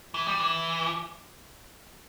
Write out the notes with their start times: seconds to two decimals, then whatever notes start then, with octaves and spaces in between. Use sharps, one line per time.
0.14 E3
0.27 G3
0.39 E3